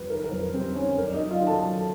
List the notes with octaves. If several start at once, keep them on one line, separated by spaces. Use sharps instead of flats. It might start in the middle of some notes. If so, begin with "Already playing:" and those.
Already playing: F2 G3 B4
D#3 A#4
A#4
F2 B4
G3 C4 C5
D#3 C#4 C#5
F#2 A#4
D5
D#4 D#5
F#3
F4 F5
D#3
A4 A5
F#3